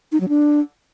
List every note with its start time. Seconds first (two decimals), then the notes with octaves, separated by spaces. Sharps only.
0.12 D#4
0.20 F#3
0.29 D4